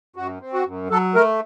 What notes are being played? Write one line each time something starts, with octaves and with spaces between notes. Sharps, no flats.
F#2 F#4
C4
F#4
F#2
F#3 A4
A3 A#4